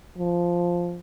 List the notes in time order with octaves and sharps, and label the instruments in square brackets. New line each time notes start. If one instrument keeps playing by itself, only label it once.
[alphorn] F3